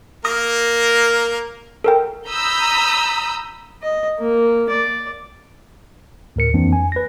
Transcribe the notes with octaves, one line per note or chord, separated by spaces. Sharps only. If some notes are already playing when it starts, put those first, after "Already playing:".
A#3 A#4 D#6 A#6
A4 A#4 G5
A#5 B5 D#6 E6 G6 B6
D#5
A#3
D5
D2 A2 A#4 C#7
F2 E3 A#3 C4 D4
G#5
B4 A#6